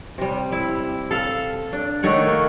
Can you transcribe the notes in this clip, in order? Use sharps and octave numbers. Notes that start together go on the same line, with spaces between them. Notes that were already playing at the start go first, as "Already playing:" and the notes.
C3 G3
E4
A4 F5
D4
D#3 A3 C#5 F#5
A#3